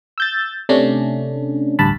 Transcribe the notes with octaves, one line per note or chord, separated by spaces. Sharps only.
E6 G6 A6
C3 A3 C#4 D4
A1 D2 G2 A5 B5